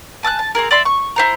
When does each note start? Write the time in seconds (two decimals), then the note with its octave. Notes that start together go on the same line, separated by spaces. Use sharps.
0.23 G#5 A5 E6 F#6
0.39 A5
0.55 C4 D4 G#4 A#4
0.71 D5 E5 C6
0.85 C#6
1.16 E4 C5 A#5